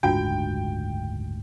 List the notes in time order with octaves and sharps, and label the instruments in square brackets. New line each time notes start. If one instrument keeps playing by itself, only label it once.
[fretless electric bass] F#1 D2 G#2 [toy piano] D4 F4 F#4 [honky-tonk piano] G5